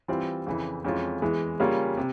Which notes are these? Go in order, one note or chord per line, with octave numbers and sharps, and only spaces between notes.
E3 G3 C4 F4
F2 C#3 E3
F2 E3 G#3 C#4 F4
E2 E3 G#3
C#3 G3 A#3 C#4 F4
C3